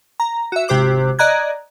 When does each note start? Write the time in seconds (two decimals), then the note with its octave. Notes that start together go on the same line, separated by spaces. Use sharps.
0.20 A#5
0.52 F#4 E5
0.68 G#1 C3 G4 C5 D6 F#6
1.19 D5 D#5 A#5 F#6 G#6